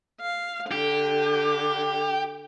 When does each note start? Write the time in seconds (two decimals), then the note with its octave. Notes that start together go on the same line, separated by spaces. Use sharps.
0.22 F5
0.71 D3 G4